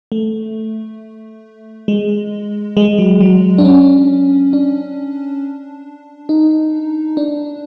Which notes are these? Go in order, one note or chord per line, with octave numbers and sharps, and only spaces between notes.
A3
G#3
G#3
F#3
F#3
D4
C#4
D4
D#4
D4